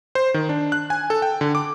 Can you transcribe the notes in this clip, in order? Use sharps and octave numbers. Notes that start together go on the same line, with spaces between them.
C5
D#3
D4
F#6
G#5
A4
G5
D3
D6